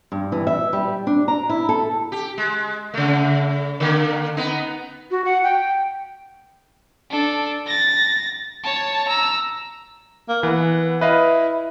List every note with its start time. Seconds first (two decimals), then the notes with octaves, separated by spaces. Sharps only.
0.12 G2
0.32 E3
0.47 E5
0.73 G3
1.07 D4
1.28 A#5
1.49 E4
1.69 A4
2.12 G4
2.38 G#3
2.94 C#3 A3
3.80 D3 A#3
4.37 B3 D#4
5.11 F#4
5.25 F#5
5.43 G5
7.10 D4 A4
7.66 A6 A#6
8.63 C#5 A5
9.07 A#5 E6
10.29 A#3
10.43 E3 B3
11.01 E4 B4 D#5 F5